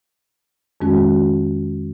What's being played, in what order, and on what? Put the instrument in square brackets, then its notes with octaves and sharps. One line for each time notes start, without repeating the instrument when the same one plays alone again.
[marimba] F2 D#3 G#3 C#4 F#4